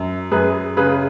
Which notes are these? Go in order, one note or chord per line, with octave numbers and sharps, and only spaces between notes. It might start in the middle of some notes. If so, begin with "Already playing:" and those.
Already playing: F#2
F#2 G#4 B4
C#3 G#4 B4